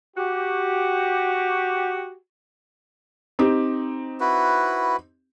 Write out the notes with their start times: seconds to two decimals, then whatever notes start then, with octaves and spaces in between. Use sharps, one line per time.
0.17 F#4 G4
3.39 C4 D#4 G4
4.20 E4 F#4 B4